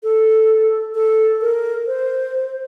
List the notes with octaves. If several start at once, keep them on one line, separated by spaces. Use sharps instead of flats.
A4
A4
A#4
C5